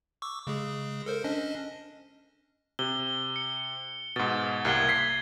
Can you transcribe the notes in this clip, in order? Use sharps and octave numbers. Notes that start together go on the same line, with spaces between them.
C#6 D6 E6
C#3 G#3 G#4
A4 A#4 C5
C#4 D4 D#5
C3 G7
C#7
G#2 B2 A6
C2 C3 A#3 C#6 G#6 G7
B6 C7